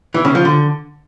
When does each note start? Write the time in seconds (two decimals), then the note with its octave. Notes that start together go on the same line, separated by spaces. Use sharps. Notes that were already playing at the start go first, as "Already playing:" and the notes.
0.14 E3
0.25 C#3
0.35 F3
0.45 D3